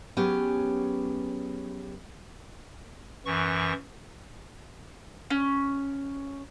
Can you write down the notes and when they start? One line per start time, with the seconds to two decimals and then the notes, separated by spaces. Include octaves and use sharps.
0.17 F#3 B3 C#4 G4 G#4
3.26 F#2 E3 C#6
5.30 C#4